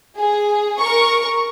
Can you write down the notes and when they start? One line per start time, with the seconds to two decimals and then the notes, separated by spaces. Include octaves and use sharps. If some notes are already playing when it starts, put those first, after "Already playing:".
0.17 G#4
0.79 A#4 C#6